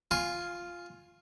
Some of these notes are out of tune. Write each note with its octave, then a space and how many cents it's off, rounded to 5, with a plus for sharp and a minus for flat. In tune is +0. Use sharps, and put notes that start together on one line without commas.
F4 +0 G#5 +0 C6 +30